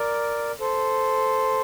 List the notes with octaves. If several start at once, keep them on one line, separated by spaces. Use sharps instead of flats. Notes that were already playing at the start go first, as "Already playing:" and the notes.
Already playing: A#4 D5
A4 C5